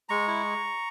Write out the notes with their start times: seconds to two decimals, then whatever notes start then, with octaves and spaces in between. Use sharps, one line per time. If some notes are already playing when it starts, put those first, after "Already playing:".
0.09 G#3 A#5 C#6
0.28 E4